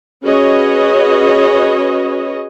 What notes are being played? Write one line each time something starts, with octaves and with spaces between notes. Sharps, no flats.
C#4 F#4 G#4 B4 C#5 D#5